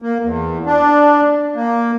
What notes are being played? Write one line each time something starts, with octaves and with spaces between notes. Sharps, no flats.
A#3
E2
D4
A#3